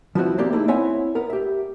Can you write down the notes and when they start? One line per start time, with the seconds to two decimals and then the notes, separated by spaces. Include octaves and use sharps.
0.15 F3 G3 B3 C4 E4 F#4
0.38 C3 A#3 C4 G4 D5
0.52 A3 A#3 D#4 E4 G#4
0.68 B3 C4 E4 C#5 F#5 G#5
1.15 B3 A#4
1.30 G4 E5